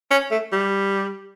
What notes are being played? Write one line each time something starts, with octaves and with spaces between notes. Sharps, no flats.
C#4
A3
G3